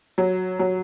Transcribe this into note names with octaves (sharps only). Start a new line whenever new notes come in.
F#3
F#3